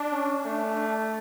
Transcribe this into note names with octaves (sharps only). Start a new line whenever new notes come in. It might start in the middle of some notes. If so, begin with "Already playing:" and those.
Already playing: D4
C#4
A3 D4